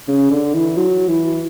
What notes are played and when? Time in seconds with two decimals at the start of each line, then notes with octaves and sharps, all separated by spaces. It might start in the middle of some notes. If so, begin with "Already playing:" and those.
0.08 C#3
0.30 D3
0.54 E3
0.77 F#3
1.08 E3